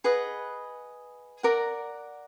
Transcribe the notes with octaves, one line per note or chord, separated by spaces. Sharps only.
G#4 B4 D#5 F#5
A#4 D5 F#5 A#5